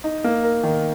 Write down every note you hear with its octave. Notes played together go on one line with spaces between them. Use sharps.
D#4
A#3
A#4
D#3